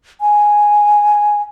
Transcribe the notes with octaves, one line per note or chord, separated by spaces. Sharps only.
G#5